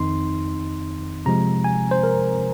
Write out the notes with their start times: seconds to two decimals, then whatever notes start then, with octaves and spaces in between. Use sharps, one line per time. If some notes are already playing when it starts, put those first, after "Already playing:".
Already playing: F2 D#3 C4 D#4 C6
1.26 C3 F3 G#3 A#5
1.64 G#5
1.91 C5
2.03 A#4